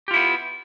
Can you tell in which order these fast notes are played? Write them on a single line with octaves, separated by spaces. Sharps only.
G4 F4 E4 B3